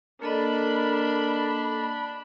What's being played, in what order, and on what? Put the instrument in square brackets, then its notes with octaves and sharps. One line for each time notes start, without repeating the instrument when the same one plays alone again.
[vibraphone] A#3 A4 D#5 [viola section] D4 B5 [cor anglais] A#4